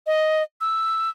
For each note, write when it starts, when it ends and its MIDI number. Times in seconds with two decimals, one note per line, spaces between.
0.06 0.43 75
0.61 1.10 88